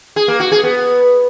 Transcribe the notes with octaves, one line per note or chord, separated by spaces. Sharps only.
G#4
A#3
F#4
G#4
B3